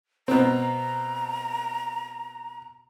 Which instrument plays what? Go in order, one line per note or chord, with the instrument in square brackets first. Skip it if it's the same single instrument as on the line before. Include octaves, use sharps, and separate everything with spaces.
[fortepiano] B2 C4 [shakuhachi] A#5